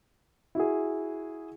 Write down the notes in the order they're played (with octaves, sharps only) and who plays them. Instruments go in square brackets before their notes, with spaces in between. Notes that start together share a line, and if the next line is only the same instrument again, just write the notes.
[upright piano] E4 F#4 G#4